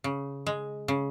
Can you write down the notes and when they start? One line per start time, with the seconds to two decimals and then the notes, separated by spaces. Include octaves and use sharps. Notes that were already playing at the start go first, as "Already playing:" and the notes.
0.04 C#3
0.47 G#3
0.88 C#3